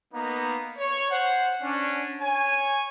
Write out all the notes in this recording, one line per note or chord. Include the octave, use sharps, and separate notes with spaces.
A#3 B3 D#4 A#5
C#5
C5 F#5
C#4 D4
C#5 G#5